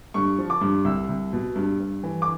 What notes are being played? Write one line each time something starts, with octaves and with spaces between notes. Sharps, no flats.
G2 C#6
F3
D6
G2
C2 E6
C2
B2
G2
G2
E3
D6